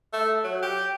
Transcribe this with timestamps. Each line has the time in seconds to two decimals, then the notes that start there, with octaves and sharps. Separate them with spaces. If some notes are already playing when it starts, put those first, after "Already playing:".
0.13 A3
0.44 F#3
0.62 G4